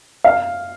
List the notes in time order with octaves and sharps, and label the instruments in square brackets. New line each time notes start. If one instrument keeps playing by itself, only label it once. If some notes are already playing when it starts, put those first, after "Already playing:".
[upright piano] F5